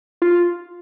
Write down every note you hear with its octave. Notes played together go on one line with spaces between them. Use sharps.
F4